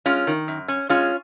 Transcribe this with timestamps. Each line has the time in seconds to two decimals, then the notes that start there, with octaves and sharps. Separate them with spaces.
0.06 G#3 C#4 F4
0.27 D#3
0.48 F#2
0.68 C#4
0.89 G#3 C#4 F4